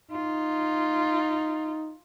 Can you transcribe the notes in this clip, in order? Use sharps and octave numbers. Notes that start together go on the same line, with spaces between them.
D#4 F4